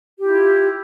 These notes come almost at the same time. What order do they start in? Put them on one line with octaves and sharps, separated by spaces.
G4 F4 E4